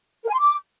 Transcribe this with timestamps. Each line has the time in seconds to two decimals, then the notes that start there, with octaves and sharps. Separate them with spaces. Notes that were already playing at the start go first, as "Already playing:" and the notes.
0.23 A#4
0.29 G#5
0.34 C6
0.39 D6